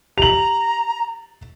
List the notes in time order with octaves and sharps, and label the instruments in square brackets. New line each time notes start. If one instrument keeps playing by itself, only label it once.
[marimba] G4 [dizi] A#5 [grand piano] F7 F#7